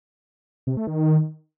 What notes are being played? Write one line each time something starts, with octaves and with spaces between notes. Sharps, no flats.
C3
A3
D#3